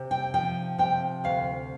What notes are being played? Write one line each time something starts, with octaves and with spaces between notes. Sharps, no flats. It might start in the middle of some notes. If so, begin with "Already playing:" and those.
Already playing: C3
G5
F3 G5
C3 G5
D2 F5